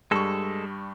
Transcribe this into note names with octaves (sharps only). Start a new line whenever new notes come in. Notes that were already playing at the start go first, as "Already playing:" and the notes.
G2 G3 G#3 A4 C#6